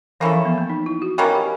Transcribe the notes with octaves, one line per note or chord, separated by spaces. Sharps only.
E3 A#3 C#4 E4 A4
F3
B3
A#3
D#4
E4
F#4
B2 G3 A#3 C#4 G4
G4